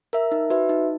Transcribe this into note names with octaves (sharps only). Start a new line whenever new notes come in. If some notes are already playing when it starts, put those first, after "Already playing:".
A#4 E5
D#4
F#4 B4 E5
D#4